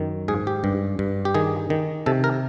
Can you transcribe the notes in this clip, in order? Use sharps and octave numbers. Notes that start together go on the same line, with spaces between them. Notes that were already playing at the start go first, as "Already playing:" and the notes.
Already playing: F#2 D#3
G#2 G#4
G4
G2
G2
G4
D#3 G#4
D#3
C3 A4
A#4